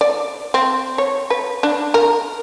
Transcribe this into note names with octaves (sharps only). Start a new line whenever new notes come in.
D5
C4
C#5
B4
D4
A#4